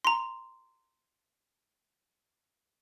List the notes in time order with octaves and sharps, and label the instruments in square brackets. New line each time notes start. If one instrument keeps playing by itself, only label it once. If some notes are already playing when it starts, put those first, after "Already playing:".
[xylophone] A#5 C6